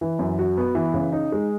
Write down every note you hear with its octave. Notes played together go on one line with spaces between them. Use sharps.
E3
F#2
F#4
B3
E3
C#3
D#4
G#3